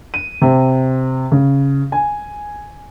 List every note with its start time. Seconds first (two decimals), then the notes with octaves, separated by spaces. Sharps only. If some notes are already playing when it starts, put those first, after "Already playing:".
0.14 D#7
0.42 C3
1.32 C#3
1.92 G#5